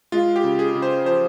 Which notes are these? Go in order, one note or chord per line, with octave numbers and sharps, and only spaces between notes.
G#3 F4
G4
C#3
G#4
C#3
C5
F3 C5